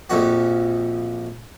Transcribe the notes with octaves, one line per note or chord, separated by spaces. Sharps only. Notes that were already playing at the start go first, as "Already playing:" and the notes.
A#1 F2 F#4